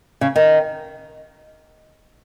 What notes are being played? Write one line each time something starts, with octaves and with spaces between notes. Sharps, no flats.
C#3
D#3